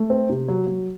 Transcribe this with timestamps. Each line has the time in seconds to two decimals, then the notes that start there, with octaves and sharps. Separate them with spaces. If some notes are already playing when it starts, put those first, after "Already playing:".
Already playing: A3
0.10 C4
0.29 C3
0.48 F#3
0.67 F#3